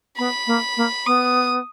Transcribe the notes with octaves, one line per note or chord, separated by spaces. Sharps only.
B3 B5
A#3
A#3
B3 D#6